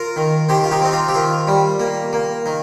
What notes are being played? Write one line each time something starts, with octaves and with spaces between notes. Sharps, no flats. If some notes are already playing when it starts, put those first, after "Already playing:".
Already playing: F4 A#4
D#3
D#3 G4 C5
F4
D#4 G4
C4 D#4
F4
G4
D#3 F4
G3
A#3
A#3
D#3